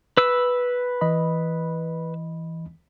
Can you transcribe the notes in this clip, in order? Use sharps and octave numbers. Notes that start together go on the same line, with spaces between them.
B4 E6
E3 D#5 B5